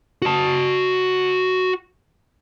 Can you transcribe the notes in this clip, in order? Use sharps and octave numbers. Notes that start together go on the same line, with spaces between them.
F#4 A5